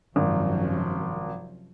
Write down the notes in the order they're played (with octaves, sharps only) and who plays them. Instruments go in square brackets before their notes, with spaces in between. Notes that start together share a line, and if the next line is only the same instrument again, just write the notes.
[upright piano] G#1 [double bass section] F#2 C3 F3